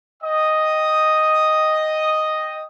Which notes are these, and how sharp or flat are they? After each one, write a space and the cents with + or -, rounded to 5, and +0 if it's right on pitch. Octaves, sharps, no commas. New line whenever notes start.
D#5 +0 G5 +0 D#6 +0